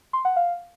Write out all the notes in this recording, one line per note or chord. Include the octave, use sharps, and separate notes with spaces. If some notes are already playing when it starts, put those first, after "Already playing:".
C6
F#5
F5